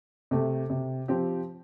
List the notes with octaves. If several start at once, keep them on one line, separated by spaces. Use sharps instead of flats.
C3 A3
C3
F3 C4 G4